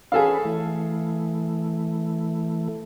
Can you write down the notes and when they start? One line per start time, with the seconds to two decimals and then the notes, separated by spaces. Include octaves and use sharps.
0.12 C#4 G#4 A4 B4 F5
0.45 E3 A3